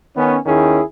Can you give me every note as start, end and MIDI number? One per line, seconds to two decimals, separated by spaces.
0.17 0.38 51
0.17 0.38 59
0.17 0.38 61
0.46 0.81 39
0.46 0.81 51
0.46 0.81 61
0.46 0.81 64
0.46 0.81 68